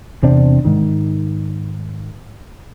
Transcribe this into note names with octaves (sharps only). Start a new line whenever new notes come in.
E2 C3 C4 D4
G#2 D#3